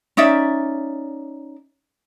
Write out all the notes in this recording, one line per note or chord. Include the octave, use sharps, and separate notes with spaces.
C#4 D#4 D5 E5